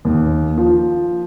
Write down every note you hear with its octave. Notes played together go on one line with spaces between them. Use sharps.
D#2
F3